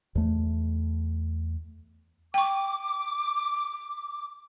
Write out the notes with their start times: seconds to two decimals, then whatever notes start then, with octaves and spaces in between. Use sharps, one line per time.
0.15 E2 A3
2.34 G5 C#6 D6